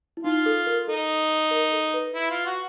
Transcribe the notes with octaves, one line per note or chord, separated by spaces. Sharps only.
E4
D#4 F4
A4
A#4
D#4 A4
A#4
A4
B4
E4
F4
F#4